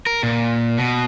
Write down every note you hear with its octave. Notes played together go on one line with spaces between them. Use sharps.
A#4
A#2
B2